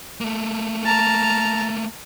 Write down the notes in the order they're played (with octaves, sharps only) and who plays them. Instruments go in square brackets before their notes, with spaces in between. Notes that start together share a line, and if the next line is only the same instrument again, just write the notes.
[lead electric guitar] A3 A#3
[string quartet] A5 A#5 F6